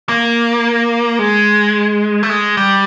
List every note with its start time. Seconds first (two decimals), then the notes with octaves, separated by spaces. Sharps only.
0.09 A#3
1.19 G#3
2.23 A3
2.30 G#3
2.57 G3